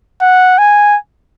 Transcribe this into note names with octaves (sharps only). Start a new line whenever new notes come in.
F#5
G#5